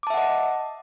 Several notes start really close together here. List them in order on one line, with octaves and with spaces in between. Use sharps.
D6 A5 E5 F#5 D#5